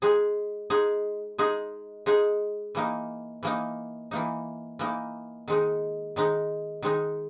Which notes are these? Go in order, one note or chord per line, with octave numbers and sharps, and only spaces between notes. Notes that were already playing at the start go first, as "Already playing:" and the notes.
G#3 D#4 G#4
G#3 D#4 G#4
G#3 D#4 G#4
G#3 D#4 G#4
E3 A#3 D#4
E3 A#3 D#4
E3 A#3 D#4
E3 A#3 D#4
D#3 G#3 D#4
D#3 G#3 D#4
D#3 G#3 D#4